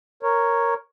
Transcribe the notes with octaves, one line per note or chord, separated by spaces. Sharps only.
A#4 C#5